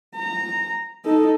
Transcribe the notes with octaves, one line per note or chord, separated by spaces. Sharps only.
A#5
D#4 A4